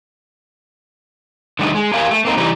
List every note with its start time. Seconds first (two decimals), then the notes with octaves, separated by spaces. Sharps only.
1.59 D3 D#3 G3 A3 D#4
1.75 G#3
1.94 G4 A#4 F5 G5 G#5
2.11 A3
2.25 A#3 C4 D#4
2.37 E3 G3 D#4